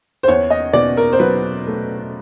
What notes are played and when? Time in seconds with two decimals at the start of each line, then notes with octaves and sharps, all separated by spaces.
0.23 C5
0.28 E2 C#5
0.50 D#5
0.73 B2 D5
0.97 A#4
1.13 C5
1.20 F#3 B4
1.67 A3